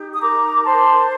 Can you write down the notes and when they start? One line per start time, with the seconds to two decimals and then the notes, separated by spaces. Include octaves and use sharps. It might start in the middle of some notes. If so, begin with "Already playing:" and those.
Already playing: D#4 G4
0.14 D#6
0.21 A#4 A#5 D6
0.64 C5 A5 C6